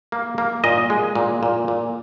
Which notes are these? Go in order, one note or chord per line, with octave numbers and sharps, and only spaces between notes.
A#3
A#3
A#2 D#5
G#3
A#2
A#2
A#2